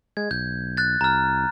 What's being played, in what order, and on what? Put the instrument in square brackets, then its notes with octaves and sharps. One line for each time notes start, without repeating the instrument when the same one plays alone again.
[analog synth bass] G#3 [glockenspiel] G#6
[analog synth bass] B1 [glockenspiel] G6
[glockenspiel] F#6 A6
[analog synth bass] C2 [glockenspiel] A#5 F6